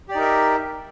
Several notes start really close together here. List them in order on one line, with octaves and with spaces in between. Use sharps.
G4 D5 D#4 A#4 E5